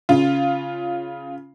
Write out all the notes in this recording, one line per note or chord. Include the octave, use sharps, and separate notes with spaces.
C#3 F4